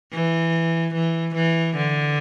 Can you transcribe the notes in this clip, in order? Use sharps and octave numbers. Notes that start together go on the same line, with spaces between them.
E3
E3
E3
D3